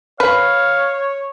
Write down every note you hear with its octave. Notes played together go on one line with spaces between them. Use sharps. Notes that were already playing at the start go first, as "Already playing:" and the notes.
B4 C#5 F5